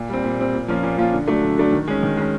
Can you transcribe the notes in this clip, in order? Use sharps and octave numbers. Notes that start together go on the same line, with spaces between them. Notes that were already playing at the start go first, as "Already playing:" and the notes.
Already playing: A#2
G3 C4
A#2
G3 C4
A#2
F3 A#3 C#4 F4
A#2
F3 A#3 C#4 F4
D3
F#3 A3 D4
D3
F#3 A3 D4
D#3
G#3 C#4
D#3
G#3 C#4